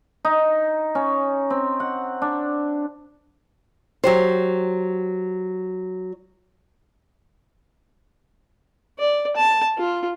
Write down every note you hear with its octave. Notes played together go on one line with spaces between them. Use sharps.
D#4
C#4
C4
F#5
D4
F#3 G4 C5
D5
A5
F4